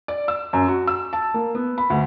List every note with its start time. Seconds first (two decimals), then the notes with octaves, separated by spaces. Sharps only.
0.08 D5
0.28 E6
0.53 F#2
0.68 F#4
0.87 E6
1.13 A5
1.34 A#3
1.55 B3
1.78 B5
1.90 D2